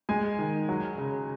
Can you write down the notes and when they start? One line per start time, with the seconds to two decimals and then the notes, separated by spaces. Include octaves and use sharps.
0.09 G#3 G#5
0.39 D#3
0.69 F#3
0.98 C#3